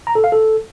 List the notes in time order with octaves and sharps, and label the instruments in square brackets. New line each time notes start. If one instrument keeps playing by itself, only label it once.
[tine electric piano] A#5
A4
F5
A4